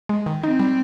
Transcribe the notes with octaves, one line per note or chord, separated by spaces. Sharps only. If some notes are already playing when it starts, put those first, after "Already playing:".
G#3
D#3
C4 D#4
G3